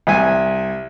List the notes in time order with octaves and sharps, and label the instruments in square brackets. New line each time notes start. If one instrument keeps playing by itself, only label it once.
[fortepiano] C2 E5 G#5